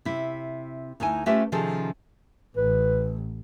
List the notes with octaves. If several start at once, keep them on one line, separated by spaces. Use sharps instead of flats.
C3 E4
D2 D#4 E4 G#5
A3 C#4 F4 G4 B4 E5
C3 D#3 F3 C#4 G#4 A4
A1 B4